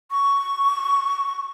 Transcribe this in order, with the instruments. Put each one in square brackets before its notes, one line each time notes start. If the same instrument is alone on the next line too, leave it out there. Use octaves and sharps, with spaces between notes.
[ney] C#6